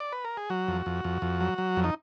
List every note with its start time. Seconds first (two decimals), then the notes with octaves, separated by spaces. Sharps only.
0.00 D5
0.12 B4
0.25 A#4
0.37 G#4
0.50 F#3 F#4
0.68 F2
0.86 F2
1.04 F2
1.22 F2
1.40 F#3
1.58 F#3
1.77 F2
1.84 D#4